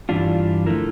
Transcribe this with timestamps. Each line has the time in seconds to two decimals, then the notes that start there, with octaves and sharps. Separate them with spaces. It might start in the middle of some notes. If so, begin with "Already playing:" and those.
0.09 G2 E3 G3 D4 F4
0.66 D3 F3 A3 E4 A#4